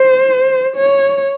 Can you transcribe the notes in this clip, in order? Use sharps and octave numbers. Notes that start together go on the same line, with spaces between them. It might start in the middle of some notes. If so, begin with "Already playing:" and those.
Already playing: C5
C#5